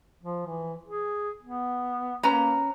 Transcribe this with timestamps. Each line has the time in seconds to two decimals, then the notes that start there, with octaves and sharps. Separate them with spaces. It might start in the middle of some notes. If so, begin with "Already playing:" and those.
0.23 F3
0.46 E3
0.86 G#4
1.43 B3
2.23 A#3 C#4 B4 A#5